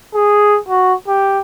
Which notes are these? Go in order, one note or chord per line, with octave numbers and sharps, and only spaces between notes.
G#4
F#4
G4